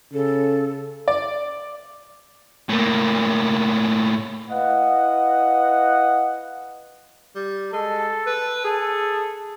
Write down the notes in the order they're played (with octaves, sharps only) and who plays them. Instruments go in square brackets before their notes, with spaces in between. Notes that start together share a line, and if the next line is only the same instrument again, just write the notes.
[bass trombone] C#3 [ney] A4
[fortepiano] D5
[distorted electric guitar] A2 A#3
[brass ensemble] E4 B4 D#5 F5 F#5
[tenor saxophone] G3
[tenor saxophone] G#3 [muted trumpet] A4
[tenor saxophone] B4
[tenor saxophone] G#4 [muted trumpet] A4